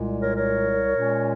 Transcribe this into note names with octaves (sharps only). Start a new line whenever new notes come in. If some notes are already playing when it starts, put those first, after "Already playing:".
Already playing: C2 A#2 G#3
A#4 C#5
A#4 C#5
A#2 G#3 C#4